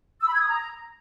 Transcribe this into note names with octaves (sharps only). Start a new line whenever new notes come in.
E6
B5
G#6
D#6
A#5